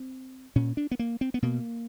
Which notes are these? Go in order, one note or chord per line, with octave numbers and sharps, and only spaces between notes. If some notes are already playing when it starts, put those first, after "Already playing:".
Already playing: C4
A#2 C#4
D4
B3
A#3
C4
B3
B2 A#3